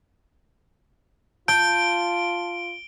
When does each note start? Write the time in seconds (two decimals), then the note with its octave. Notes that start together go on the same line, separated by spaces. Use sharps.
1.48 F4 A5 G6 D7 G7